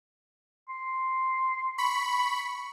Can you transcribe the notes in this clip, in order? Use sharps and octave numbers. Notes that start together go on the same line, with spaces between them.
C6
B5 C#6